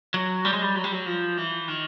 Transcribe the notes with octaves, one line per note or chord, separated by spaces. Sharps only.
F#3
G3
G#3
G3
F#3
G3
F#3
F3
E3
D#3